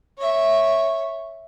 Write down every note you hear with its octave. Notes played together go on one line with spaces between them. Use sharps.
C#5 E5